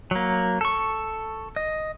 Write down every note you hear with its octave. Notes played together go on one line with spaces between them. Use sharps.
F#3 A#3
A4 C#6
D#5